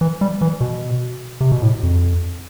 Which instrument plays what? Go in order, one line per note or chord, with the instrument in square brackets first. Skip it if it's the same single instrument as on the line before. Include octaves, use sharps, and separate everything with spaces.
[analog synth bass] E3
G3
E3
B2
C3
B2
A2
F2